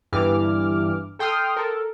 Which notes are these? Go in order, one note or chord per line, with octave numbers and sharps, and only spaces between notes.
G1 G2 E3 D6 F6
A4 G5 C6 D#6 F6
A4 A#4